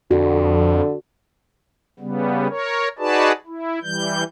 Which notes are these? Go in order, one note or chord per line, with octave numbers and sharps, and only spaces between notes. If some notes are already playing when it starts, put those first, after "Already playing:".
F2 D3 F#4
C#3 G3 B3
A#4 C#5
D#4 F#4 G#4 B4 D5 A5
E4
E3 G3 G6